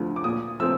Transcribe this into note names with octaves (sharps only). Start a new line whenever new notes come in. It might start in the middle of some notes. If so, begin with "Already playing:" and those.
Already playing: D2 D3 F3
D6
A#2 D#6
F3 A3 C4 E6